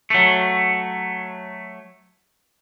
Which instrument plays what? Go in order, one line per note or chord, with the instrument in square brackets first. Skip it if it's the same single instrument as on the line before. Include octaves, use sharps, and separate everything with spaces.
[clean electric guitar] F#3 A3